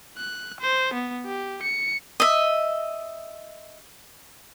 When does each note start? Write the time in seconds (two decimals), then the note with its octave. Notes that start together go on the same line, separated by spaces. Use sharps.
0.17 F#6
0.61 C5
0.94 B3
1.26 G4
1.63 C#7
2.20 D#5 E5